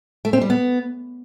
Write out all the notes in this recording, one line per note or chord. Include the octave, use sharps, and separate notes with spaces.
A3
C4
G3
B3